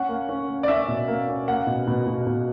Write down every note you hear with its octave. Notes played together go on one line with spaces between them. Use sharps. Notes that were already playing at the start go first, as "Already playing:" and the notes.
Already playing: C#4 F#5
A#3
C#4
A#3
D5
C#4 E5
B2
A#3
C#4
A#3 F#5
B2
B2
B2
B2